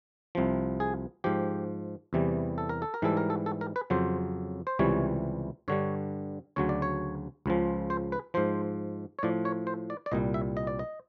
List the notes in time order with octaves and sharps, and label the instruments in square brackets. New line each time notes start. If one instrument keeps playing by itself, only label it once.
[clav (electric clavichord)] C2 C3 F3
G#4
G#2 F3 G4
E2 C3 E3 G3
A4
A#4
A4
A#4
G#2 E3 G3 A4
A#4
A4
A4
A#4
B4
F2 C#3 F#3 C5
C5
C#2 C3 E3 G3 C#5
G2 D3 G3 C#5
D2 C#3 F#3 C#5
D5
C#5
C#2 C#3 F3
C5
B4
G#2 F3 C5
C#5
A2 F3 D5
C#5
C5
D5
D5
C2 A#2 G3 D#5
E5
D#5
D5
D#5